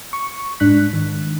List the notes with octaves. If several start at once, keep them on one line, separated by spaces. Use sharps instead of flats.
C#6
G#2 D4 F#6 B6
D#3